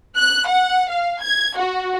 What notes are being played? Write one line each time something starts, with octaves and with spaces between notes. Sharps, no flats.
F#6
F#5
F5
G#6
F#4